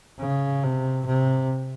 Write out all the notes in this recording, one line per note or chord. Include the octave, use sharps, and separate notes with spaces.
C#3
C3
C3